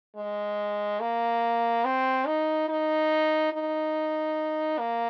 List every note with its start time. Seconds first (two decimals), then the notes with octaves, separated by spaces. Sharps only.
0.17 G#3
1.01 A#3
1.85 C4
2.27 D#4
2.69 D#4
3.53 D#4
4.79 A#3